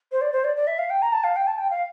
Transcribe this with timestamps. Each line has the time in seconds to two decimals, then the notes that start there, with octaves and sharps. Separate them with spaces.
0.12 C5
0.21 D5
0.32 C5
0.44 D5
0.56 D5
0.67 E5
0.78 F5
0.90 G5
1.02 A#5
1.12 A5
1.24 F5
1.36 G5
1.47 A5
1.58 G5
1.70 F5